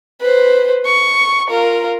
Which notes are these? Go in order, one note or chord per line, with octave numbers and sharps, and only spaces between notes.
B4 C5
C#6
F4 A#4